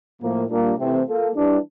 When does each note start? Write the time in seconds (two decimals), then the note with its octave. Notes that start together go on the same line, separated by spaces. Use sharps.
0.22 A2 F3 A#3
0.50 A#2 G3 A#3 D4
0.79 C3 E3 A3 C4
1.07 A#3 F4 A4
1.35 E3 G3 D4